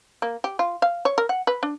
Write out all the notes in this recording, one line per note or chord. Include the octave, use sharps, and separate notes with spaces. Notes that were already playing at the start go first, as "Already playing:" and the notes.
A#3
G4
F4
F5
C#5
A#4
F#5
B4
D4